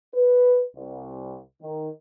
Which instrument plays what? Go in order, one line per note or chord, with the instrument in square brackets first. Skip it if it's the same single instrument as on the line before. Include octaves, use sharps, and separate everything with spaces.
[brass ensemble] B4
C2
D#3